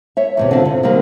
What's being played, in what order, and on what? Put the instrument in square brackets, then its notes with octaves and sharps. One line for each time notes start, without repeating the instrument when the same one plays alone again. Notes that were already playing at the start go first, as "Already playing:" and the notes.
[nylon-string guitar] C#5 E5
E2 A2 C3
D3 C4 F4
C3
D3 D#3 G3 A#3 C4